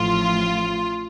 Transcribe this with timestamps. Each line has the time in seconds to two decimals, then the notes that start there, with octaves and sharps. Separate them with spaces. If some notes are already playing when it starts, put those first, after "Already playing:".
Already playing: A1 A2 F3 F4